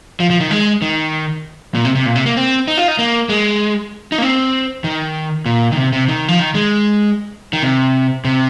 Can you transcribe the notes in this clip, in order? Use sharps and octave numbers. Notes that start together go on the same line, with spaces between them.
F3
F3
D#3
G#3
D#3
A#2
C3
C3
A#2
C3
A#3
C4
D#4
F4
D#4
A#3
G#3
D#4
A#3
C4
D#3
A#2
D#3
C3
C3
D#3
F3
D#3
G#3
D#3
C3
C3